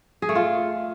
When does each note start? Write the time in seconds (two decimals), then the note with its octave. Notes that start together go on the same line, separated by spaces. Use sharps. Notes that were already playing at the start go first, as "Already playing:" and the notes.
0.22 G#4
0.29 A3
0.35 F4